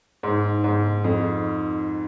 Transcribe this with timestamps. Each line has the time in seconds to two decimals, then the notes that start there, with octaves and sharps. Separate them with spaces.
0.23 G#2
0.64 G#2
1.04 F2